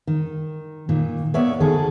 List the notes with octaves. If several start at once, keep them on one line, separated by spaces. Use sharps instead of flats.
D#3
A#2 D#3
A#3 B3 C#5 D5 E5
D2 D#3 G#4 A4